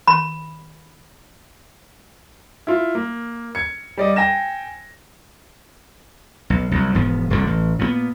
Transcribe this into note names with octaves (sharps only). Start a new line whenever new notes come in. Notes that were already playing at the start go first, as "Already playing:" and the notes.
B5
E4 F4
A#3
G#6 C#7
G3 D5 D#5
G5 G#5 A#6 E7
B1
C2 F#3
E1 G#2 F3 B3
F1 C2 G#2 D3
A1
A#2 F#3 B3